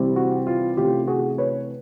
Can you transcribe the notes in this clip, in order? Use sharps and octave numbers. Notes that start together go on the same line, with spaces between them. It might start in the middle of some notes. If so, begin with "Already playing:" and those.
Already playing: C3 E3 G3 C4
F#4
F4
C3 E3 A3 C#4 F4 G4
F#4 G#4
B4 C#5